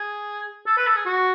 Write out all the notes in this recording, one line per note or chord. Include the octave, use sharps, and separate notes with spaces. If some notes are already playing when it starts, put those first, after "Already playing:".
Already playing: G#4
A4
B4
A4
G#4
F#4